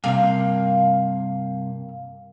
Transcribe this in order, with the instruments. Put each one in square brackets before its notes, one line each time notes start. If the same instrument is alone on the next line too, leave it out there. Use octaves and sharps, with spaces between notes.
[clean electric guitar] G2 C3 [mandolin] A#3 F5